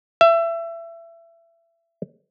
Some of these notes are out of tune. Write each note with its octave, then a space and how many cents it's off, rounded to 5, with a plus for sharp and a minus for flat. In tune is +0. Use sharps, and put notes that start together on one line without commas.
E5 +25